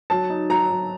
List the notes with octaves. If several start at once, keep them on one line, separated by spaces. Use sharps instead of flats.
F#3 A5
D#4
F#3 A#5
F#3